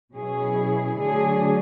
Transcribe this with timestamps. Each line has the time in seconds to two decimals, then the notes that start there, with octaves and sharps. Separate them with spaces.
0.16 B2 F#3 C#4 E4 G#4
0.99 D3 F#3 A3 D4 G#4